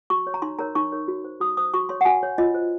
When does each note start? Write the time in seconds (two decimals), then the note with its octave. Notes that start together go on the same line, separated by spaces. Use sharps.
0.10 F#4 C#6
0.27 C#5
0.34 A#5
0.42 D#4 C6
0.59 A#4 C#5 A#5
0.75 D#4 C#6
0.92 A#4 C#5
1.08 F#4
1.25 C5
1.41 F#4 D#6
1.57 C5 D#6
1.74 F#4 C#6
1.89 C#5 C6
2.01 F#5
2.05 F#4 G#5
2.23 C#5
2.38 F4 D#5
2.54 C5